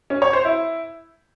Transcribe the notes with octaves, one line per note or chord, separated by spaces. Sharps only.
C#4
C#5
C5
E4